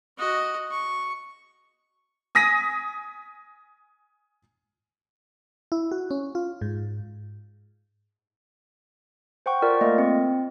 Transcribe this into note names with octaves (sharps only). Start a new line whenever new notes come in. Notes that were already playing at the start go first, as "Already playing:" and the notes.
F#4 D#5
C#6
G#5 D#6 A#6 B6 D#7
E4
F#4
C#4
F4
G#2
C5 F#5 G5 C#6
F4 A#4 D5
A3 A#3 F4 D#5
C4